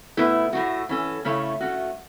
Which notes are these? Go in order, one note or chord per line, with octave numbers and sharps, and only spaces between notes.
B2 A3 E4 B4
A2 A3 F#4
E3 C#4 A4
C#3 A3 C#4 E4 C#5
A3 C#4 F#4